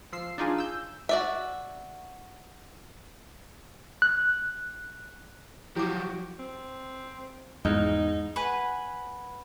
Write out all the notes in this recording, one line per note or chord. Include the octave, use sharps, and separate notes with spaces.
F3 E6 C7
D4 D#4 F4 G#4
E6 G6
F#4 D5 E5
F#6
F3 F#3 E4 F#4 G4 D6
C4
E2 G#2 D#4
B4 F#5 G#5